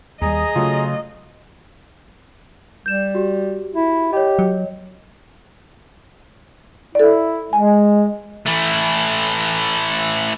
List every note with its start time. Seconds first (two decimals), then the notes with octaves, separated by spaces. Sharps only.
0.21 D#2 G3 G#4 D#5 A#5
0.56 C#3 F#3 A3 F4
2.86 G3 G6 E7
3.15 F#4 G4
3.74 E4
4.13 G4 C#5 D#5
4.39 F#3
6.95 E4 A4 D5
7.53 G#3 G#5
8.46 E3 A3